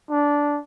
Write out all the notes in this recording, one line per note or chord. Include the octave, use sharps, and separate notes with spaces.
D4